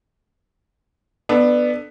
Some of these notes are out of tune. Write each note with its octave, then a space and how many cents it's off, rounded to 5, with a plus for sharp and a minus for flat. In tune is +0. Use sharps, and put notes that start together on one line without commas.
B3 +0 D4 +20 A4 +0